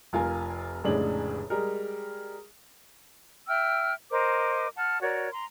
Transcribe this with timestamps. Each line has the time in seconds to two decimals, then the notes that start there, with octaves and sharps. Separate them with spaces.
0.13 F1 F4 A#4 G#5
0.84 F1 A2 C#3 G#3 D4 F#7
1.50 G3 G#3 A#4
3.48 E5 G5 E6 F6
4.10 A#4 C5 D#5 D6
4.77 F#5 A5 F6
5.02 F#4 A#4 C#5 D5
5.31 A#5 C6